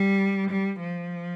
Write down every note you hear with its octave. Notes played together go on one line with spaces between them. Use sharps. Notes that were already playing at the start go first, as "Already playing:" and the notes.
Already playing: G3
G3
F3